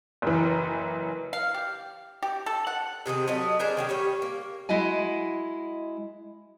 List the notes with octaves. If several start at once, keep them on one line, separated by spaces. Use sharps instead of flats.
F#1 E3
F5
G4
G4
A4
F#5
C3 D#3 C4 G#4
F#3 A3 D#5
D4 G#4 A#4 C5
D#3 C#4 G4
G3 C#4 C#5
A#3
G#3 E4 F#4 D#5 G#5